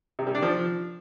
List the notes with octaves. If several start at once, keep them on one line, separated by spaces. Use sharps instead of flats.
C3
G3
D4
F3